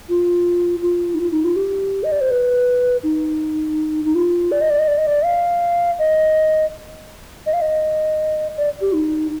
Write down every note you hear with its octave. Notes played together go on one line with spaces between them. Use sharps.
F4
F4
D#4
F4
D#4
F4
G4
D#5
D5
C5
B4
D#4
D#4
F4
D5
D#5
D5
D#5
D5
D#5
D5
F5
D#5
D#5
F5
D#5
D5
G4
D#4